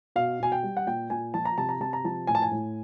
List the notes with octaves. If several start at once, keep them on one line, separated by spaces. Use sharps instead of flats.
B2 F5
B2 G#5
G5
G3
F#5
A#2 G5
A#2 G#5
F3 A5
A#5
C3 A5
A#5
C3 A5
A#5
F3 A5
A2 G#5
A5
G#5
A2